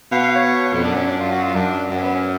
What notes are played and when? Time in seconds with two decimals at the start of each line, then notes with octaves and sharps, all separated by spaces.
0.11 B2 F5
0.23 F5
0.35 C#5
0.74 F2
0.83 F#2 D4
0.95 C#4
1.06 D4
1.20 F4
1.32 F#4
1.43 F4
1.55 F#2 D4
1.91 F#2
1.96 C#4
2.03 B3
2.15 C#4